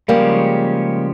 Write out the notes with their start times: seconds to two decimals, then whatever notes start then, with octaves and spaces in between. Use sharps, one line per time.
0.08 C#3 F3 G3 G#3 A#3 C#4 G4